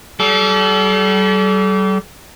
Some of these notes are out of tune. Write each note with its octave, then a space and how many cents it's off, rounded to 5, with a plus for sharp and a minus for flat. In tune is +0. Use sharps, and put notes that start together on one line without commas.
G3 -35 A4 -35